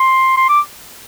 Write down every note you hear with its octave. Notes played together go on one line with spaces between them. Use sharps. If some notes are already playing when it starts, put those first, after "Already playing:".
Already playing: C6
C6
D6